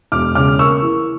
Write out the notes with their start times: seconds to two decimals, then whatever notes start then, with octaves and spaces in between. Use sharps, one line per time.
0.12 E1 D6 F6
0.35 C#3 D6 F6
0.58 A#3 C#6 E6
0.82 E3